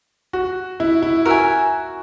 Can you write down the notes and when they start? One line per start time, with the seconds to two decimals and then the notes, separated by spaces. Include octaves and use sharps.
0.33 F#4
0.80 E4
1.02 E4
1.25 F#4 A#4 E5 G#5